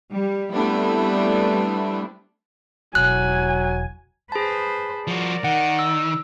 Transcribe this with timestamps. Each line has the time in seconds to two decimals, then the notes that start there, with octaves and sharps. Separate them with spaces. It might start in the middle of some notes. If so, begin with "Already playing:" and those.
0.13 G3
0.52 G3 A3 B3 C4 D4 E4
2.95 E1 F#3 G#5 F#6
4.32 G#4 B4 C5 A5
5.07 F3 F#4 A#4 D5
5.44 D#3 F#5
5.79 E6